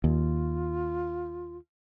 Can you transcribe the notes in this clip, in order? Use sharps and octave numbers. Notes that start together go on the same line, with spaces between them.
D#2 F4